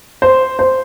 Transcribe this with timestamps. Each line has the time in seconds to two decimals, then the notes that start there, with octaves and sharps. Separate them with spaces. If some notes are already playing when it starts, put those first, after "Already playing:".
0.22 C5
0.59 C5